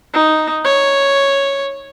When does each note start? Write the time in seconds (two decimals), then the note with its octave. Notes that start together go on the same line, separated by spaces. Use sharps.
0.14 D#4
0.65 C#5